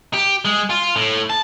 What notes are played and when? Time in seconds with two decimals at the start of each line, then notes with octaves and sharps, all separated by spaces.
0.14 G4
0.45 G#3
0.70 F4
0.96 A2
1.30 A5